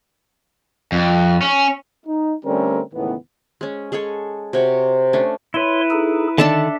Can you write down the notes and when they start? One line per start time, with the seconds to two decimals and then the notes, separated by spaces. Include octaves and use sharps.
0.92 F2
1.42 C#4
2.06 D#4
2.45 D3 G3 A3 C4 C#4 A#4
2.94 C#2 A2 D#3 E3 B3
3.61 G#3 C#4
3.92 G#3 G#4 A4 C#5
4.53 C3 F#4 C#5
5.13 A3 C#4 D4
5.54 E4 B4 C#5 C6
5.91 D#4 G#4 A4
6.38 D3 D#3 D4 A4 E5 A5